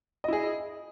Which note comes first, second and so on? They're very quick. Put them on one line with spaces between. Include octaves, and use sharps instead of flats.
D#5 E4 G#4